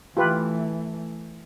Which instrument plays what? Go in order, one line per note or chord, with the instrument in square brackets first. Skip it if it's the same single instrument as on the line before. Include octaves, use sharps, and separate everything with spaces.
[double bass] E3 A3 [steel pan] F4 G4 B4